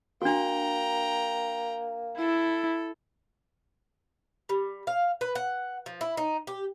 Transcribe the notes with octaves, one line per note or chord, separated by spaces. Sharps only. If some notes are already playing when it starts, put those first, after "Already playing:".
A#3 D4 F#4 G5 A#5
E4 A4
G3
F5
B4
F#5
F3
E4
D#4
G4